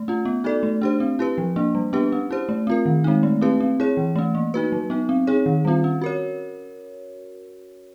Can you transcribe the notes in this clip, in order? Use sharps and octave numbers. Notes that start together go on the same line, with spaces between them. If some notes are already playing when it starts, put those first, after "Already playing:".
Already playing: A3
C#4 F4
B3
D#4 F#4 A4 D5
A3
D4 G4 C5
C4
E4 G4 B4
F3
A#3 D4
G3
B3 D4 G4 B4
C#4
E4 G4 C5
A3
C4 F4 A#4
D#3
G#3 C4 D#4
A3
C4 E4 G4 B4
C4
E4 G#4 C#5
E3
A3 C#4
A#3
D#4 F#4 B4
F#3
B3 D#4
C4
D#4 G#4 C#5
D#3
G3 C4 F4
C#4
F#4 A#4 C#5